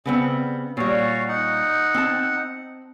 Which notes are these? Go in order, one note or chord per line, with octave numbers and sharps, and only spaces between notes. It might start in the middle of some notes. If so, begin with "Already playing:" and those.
C#3 G3 B3 C4
A#2 G3 F#4 C#5 F5
D#4 F#5
C4 A5